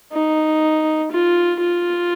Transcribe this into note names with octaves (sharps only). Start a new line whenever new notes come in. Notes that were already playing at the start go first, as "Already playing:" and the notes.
D#4
F4
F4